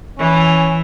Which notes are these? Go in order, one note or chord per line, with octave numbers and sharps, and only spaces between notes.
E3 C#4